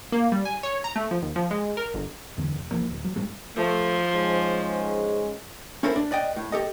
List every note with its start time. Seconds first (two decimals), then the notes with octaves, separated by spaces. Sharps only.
0.12 A#3
0.32 G3
0.45 G#5
0.63 C#5
0.84 A#5
0.96 A3
1.11 F3
1.23 D#2
1.36 F3
1.51 G#3
1.77 A#4
1.94 G1
2.38 E2 G#2 D3 E3
2.56 E1
2.71 C2 E3 F3 A#3
2.90 D1
3.05 F#3
3.16 G#2 G3 A3
3.57 F3 A3
4.13 G#2 G#3 C#4
5.83 C#4 E4 A4 A#4 C5
5.96 D4
6.11 B4 D5 D#5 G5
6.36 A2
6.52 G4 A4 D#5